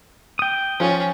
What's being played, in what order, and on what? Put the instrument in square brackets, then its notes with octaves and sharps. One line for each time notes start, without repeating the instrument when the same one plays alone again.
[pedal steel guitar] G5 D#6
[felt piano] F3 F4 [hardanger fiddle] C#4